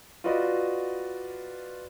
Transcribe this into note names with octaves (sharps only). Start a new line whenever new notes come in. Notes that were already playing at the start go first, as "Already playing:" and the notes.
F4 F#4 B4 D5 D#5